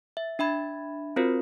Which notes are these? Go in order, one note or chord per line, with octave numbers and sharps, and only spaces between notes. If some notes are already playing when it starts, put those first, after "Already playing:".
E5
D4 E5 B5 G#6
C4 F4 F#4 A#4 C5